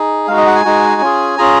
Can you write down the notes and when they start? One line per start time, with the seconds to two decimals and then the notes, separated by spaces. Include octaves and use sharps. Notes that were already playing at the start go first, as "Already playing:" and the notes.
Already playing: D#4 G#4
0.28 G#3 D#4 F#4 F5
0.37 D#5
0.46 F#5
0.55 G#5
0.65 G#3 D#4 F#4
1.01 C#4 F4 G#4
1.38 C#4 F4 G#4 A#5